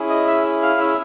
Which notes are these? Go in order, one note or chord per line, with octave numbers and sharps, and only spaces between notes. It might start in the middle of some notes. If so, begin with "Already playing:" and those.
Already playing: C#4 E4 G#4
D#5 D#6
E5 E6
F5 F6
E5 E6